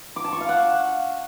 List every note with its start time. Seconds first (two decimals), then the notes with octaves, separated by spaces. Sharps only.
0.16 D6
0.24 A5
0.33 C#6
0.41 F5
0.49 F#5